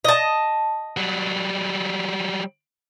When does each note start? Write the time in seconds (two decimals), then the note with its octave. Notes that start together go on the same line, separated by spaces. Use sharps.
0.04 D#5 A5
0.97 F#3 G3